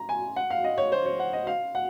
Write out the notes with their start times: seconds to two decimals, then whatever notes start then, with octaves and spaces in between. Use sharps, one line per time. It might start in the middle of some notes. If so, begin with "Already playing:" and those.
Already playing: A#5
0.09 G#5
0.36 F#5
0.50 F5
0.64 D#5
0.78 C#5
0.92 C5
1.06 C#5
1.20 F#5
1.33 D#5
1.47 F5
1.75 F#5